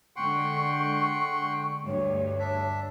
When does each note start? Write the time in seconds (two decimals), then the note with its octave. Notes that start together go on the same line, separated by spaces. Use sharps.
0.16 D3 G#3 F#5 G5 C6 C#6
1.86 D2 G2 C#5
2.39 D4 E5